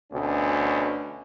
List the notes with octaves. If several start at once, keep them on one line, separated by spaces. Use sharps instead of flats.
D2 B2 C#4